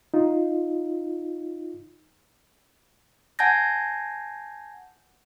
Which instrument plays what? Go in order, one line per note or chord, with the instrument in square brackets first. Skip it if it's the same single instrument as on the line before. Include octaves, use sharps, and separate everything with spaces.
[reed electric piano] D#4 F4
[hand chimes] F#5 G#5 A5 G6 G#6 A#6